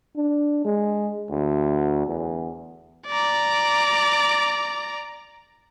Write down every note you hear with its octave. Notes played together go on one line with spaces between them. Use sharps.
D4
G#3
D2
E2
D5 A#5